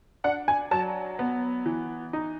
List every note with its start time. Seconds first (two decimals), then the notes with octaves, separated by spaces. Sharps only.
0.24 D4 F#5
0.48 G#5
0.71 F#3 A5
1.19 B3
1.66 E3
2.13 D#4